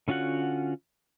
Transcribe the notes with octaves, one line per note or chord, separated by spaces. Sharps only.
D3 C#4 F4 F#4 F#5